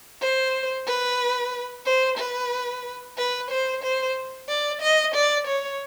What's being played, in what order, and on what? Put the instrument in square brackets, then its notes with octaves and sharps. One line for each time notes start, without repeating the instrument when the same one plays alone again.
[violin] C5
B4
C5
B4
B4
C5
C5
D5
D#5
D5
C#5